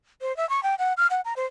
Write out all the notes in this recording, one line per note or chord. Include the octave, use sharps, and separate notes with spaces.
C5
E5
C#6
G5
F#5
F6
F#5
A#5
C5